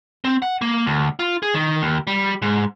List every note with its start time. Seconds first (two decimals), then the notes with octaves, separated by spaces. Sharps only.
0.24 C4
0.42 F#5
0.61 A#3
0.86 D2
1.19 F4
1.43 G#4
1.54 D#3
1.82 D#2
2.07 G3
2.42 G#2